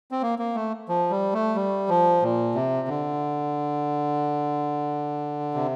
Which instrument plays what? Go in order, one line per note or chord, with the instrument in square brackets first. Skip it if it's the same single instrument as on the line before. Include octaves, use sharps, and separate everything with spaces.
[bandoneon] C4
A#3
A#3
A3
F3
G3
A3
G3
F3
A#2
C3
D3
C3